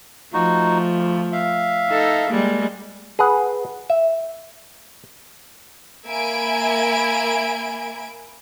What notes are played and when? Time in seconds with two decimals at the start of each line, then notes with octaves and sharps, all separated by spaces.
0.34 F3 A3 D#4 F#4
0.97 D2
1.32 E5 F5
1.90 D#4 A4
2.31 G3 G#3 A#3
3.19 G#4 B4 F#5
3.90 E5
6.06 A#3 E5 G#5 B5 G#6 D7